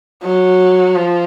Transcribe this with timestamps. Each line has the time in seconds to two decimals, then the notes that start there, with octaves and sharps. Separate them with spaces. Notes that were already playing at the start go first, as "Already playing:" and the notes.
0.24 F#3
0.95 F3